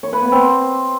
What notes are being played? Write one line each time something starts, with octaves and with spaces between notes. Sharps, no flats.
C#5
B4
B3
C4